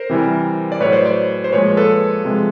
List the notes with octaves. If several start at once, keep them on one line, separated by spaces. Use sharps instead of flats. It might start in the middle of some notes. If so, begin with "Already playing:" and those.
Already playing: A#4 C5
C3 E3 G3
D5
A2 F#3 B4 C#5
C5 D5
C5 D5
C5
A#2 F3 G#3 B4 C#5
A4 B4
C3 F3 G#3